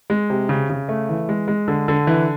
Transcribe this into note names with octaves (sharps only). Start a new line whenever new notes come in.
G#3
C3
C#3
C#3
A3
E3
G#3
G#3
D3
D3
E3